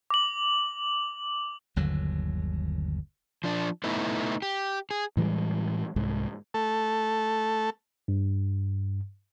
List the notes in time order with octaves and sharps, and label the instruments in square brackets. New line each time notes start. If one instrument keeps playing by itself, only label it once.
[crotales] D6 F#7
[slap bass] G1 D#2 D3 F#3
[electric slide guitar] F3 D4
A3 B3 D#4 E4
G4
G#4
[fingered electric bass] A2 E3 G3 G#3
C2 G#2
[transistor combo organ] A3 A4
[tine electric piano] G2